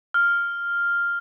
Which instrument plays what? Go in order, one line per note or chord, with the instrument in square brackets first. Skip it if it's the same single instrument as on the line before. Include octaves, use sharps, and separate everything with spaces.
[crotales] F6